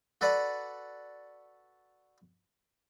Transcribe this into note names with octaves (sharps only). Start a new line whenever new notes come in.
F#4 A4 B4 D5 F#5